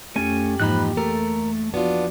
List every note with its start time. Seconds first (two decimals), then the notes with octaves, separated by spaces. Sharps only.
0.16 F2 A3 C#4 G4 G#5
0.60 G#2 E3 F3 A#3 D#4 B5 F#6
0.97 A3 A4 A#4
1.74 F3 B3 D4 F4 F#4